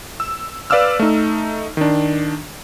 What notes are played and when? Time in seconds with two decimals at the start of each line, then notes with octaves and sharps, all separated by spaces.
0.20 E6
0.70 B4 D5 F5 D6 E6 F6
1.00 A3 D#4
1.77 D#3 D4